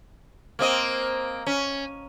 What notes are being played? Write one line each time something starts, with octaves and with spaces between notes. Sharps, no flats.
A#3 C4 D#5
C#4